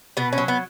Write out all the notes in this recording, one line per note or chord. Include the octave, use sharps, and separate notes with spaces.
B2 B3
C#4
F#3
B3